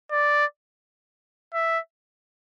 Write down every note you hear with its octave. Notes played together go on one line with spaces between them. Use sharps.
D5
E5